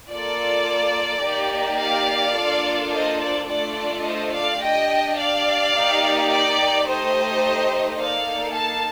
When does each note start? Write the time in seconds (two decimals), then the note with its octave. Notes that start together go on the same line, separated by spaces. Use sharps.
0.12 A#3 F4 A4 D5
1.24 A#3 D#4 G4
1.81 D5 F5
2.37 A#3 D4 F4 A4
2.93 C5 D#5
3.21 D5
3.49 A3 D4 F4 A4 D5
4.05 C5 D#5
4.33 D5 F5
4.62 D4 G4 D#5 G5
5.18 D5 F5
5.74 A#3 D#4 G4
6.30 D5
6.86 A3 D#4 G4 C5 D#5
7.98 A#3 D#4 A4 D5 F5
8.55 F5 A5